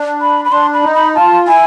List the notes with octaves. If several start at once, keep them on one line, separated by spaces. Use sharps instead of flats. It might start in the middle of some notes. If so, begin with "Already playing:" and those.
Already playing: D4
B5
B5
D4 C6
B5
D#4
B5
F4 A5
E4 G#5